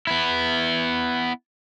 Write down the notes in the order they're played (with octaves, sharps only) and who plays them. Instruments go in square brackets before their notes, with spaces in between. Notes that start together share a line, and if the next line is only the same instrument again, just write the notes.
[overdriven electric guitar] B3 E4